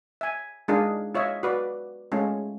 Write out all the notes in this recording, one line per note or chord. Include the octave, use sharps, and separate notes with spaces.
E5 G#5
G#3 D4 D#4 F4 G#4 A#4
F4 C#5 D#5 E5
F#4 B4 D5
G#3 A3 C#4 F4